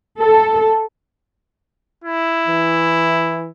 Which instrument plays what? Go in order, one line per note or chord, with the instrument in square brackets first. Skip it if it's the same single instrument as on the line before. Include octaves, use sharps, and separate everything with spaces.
[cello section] A4
[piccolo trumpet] E4
[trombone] E3